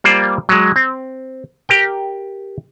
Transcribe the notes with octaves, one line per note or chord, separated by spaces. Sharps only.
G3 A#3 F4 C5 D5
F#3 G#3
C4
G4 A#4 G5